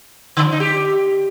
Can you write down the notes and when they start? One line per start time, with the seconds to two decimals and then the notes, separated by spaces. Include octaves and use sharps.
0.37 D3
0.44 F3
0.52 D#4
0.60 G4